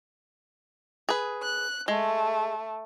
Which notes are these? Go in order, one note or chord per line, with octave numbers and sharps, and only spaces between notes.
G#4 B4
F#6
G#3 A3